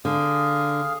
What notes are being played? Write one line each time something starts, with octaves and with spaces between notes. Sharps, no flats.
D3 G#4 F5